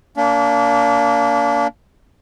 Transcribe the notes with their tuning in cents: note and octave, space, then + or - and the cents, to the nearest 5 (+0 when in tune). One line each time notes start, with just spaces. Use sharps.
A#3 -10 D4 -35